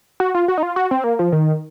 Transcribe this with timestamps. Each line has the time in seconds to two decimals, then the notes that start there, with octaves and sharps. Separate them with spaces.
0.20 F#4
0.35 F4
0.48 F#4
0.58 D#4
0.63 F4
0.76 F#4
0.91 C4
1.04 A#3
1.19 F3
1.32 D#3